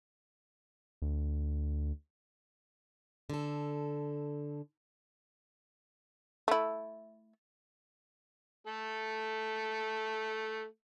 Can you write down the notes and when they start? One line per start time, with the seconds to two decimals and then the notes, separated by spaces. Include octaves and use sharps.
1.02 D2
3.30 D3 A4
6.48 A3 E4
8.67 A3 A4